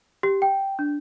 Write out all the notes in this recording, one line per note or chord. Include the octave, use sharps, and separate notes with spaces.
G4
G5
D4